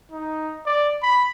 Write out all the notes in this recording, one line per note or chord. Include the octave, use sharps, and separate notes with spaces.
D#4
D5
B5